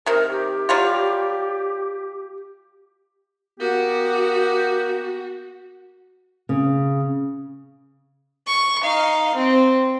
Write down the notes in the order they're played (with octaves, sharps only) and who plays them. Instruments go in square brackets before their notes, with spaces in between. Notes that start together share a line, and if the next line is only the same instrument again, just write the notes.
[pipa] C3 D#3 [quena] A#4
[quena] G4
[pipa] F#3 G3 F4
[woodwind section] A#3 B3 G4 [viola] F#4
[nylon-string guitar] C#3
[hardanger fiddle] C#6
D#4 F5
C4